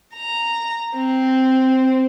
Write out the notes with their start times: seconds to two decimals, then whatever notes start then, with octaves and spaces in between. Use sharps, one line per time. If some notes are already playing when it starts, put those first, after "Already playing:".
0.15 A#5
0.96 C4